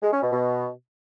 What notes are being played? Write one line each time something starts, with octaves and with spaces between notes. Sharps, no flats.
G#3
C#4
B2
B2